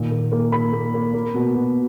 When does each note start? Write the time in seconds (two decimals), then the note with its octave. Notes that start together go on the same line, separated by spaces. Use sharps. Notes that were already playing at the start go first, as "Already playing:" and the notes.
Already playing: A#2 D#3
0.11 A#3
0.32 A#3
0.52 A#3 B5
0.73 A#3
0.94 A#3
1.14 A#3
1.34 B2
1.55 B2